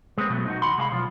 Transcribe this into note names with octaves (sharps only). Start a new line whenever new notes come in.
G#3 B3 C4
B2 F#3 A3
D#4 F4 F#4
D#2 F#5 B5 C6
C2 G#3 G4 F5 B5
B1 F3 F4